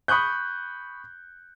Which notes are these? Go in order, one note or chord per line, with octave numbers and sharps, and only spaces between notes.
B5 C#6 D#6 F#6 G6